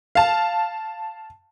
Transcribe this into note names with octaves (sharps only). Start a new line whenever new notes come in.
F5 A5